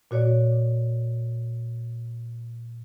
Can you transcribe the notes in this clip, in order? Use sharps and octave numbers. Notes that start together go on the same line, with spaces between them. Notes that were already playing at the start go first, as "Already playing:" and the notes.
A#2 F#4 C#5 D5